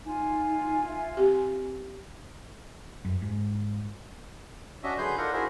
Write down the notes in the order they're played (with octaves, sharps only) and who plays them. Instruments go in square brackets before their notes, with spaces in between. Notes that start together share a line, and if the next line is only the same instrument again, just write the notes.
[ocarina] D#4 [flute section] F4 G#5
[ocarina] E5
[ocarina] C4 [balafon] G4
[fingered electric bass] F#2
G#2
[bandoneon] C#4 D4 F#4 D#5 E5
D3 F#3 G#4 B4 C6 G6
D4 D#4 F4 A4 A#4 F#5
E4 F#4 G#4 A#4 C5